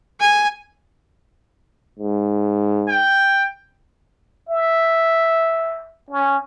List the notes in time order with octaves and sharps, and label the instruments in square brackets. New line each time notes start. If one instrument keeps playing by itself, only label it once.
[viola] G#5
[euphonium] G#2
[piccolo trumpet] G5
[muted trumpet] E5
C#4